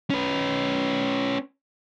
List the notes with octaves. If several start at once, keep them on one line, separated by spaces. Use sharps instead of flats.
C#4 B4